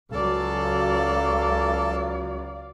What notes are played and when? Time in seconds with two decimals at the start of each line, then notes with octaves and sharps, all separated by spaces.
0.12 C#2 F#3 A4 D5 F5 A5